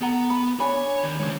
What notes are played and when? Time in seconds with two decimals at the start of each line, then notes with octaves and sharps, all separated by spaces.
0.01 B3 A4 F#5 A#5
0.30 B5
0.60 D4 C#5 G#5 B5
1.03 D#2
1.19 G#2 C#3 C#5